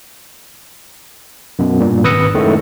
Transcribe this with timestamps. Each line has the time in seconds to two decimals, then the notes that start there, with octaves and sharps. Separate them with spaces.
1.59 F#2 B2
1.80 G2 A#2
2.04 G#1 B4 D#6 E6 A#6 C#7
2.34 F#2 A2 D#3 G#3 A3